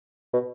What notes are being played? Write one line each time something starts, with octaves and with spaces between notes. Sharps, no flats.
B2